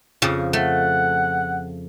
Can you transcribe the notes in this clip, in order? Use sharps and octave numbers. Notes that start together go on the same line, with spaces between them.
F2 C#3 F3
A3 F#5